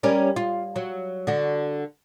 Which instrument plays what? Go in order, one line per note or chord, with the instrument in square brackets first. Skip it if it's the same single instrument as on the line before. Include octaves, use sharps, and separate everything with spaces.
[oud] G3 C#4 A#4
F4
F#3
D3 F#4